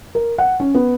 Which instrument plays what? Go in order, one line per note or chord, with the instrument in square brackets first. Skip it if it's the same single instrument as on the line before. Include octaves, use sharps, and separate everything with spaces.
[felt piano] A#4
F#5
C#4
B3